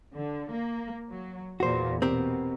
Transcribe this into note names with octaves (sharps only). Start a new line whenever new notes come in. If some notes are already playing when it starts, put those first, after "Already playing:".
D3
A#3
F#3
E2 A#2 F#4 C5
B2 C4 G4 A#4